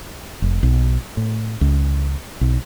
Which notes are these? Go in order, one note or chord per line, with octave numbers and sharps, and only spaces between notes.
F1
B1
A2
C#2
B1